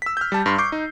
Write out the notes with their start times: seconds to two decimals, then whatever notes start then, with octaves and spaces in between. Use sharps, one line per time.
0.02 E6 B6
0.17 F6 G6
0.32 G3 A5
0.46 G2 C6
0.58 C#6 D6 G6 C7
0.72 D#4